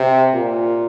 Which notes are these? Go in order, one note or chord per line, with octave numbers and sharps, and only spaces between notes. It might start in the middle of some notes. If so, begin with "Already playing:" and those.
Already playing: C3
A#2